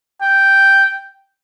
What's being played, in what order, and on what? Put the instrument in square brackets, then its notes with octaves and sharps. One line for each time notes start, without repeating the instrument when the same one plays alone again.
[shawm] G5